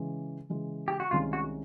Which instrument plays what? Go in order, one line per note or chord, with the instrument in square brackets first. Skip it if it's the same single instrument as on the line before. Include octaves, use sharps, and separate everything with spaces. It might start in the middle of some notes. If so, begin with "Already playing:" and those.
Already playing: [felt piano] C#3 E3 G#3
C#3 E3 G#3
[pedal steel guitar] G4
F#4
[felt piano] C2 C3 D#3 G#3 C#4 [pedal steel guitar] F4
[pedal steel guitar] F#4